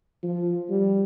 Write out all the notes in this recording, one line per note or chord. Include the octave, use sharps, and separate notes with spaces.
F3
G3